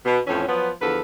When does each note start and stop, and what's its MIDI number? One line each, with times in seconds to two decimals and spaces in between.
0.06 0.20 47
0.27 0.45 41
0.27 0.45 45
0.27 0.45 52
0.27 0.45 61
0.48 0.69 53
0.48 0.69 54
0.48 0.69 59
0.82 1.02 40
0.82 1.02 50
0.82 1.02 53
0.82 1.02 69
0.82 1.02 71